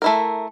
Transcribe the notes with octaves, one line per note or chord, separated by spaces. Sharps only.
A3 E4 A#4